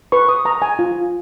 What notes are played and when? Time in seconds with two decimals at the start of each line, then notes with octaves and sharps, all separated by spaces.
0.12 B4 C#6
0.29 D#6
0.45 B4 A#5
0.62 G#5
0.79 F4